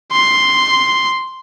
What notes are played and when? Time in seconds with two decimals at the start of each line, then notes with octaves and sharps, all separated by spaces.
0.12 C6